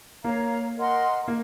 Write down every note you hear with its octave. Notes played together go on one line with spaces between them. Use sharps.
A#3 A#4 C#5 F5 A#5
A#4 D#5 F#5 C6
A#3